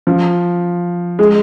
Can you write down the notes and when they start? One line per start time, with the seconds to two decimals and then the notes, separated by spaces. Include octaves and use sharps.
0.07 F3
1.19 G#3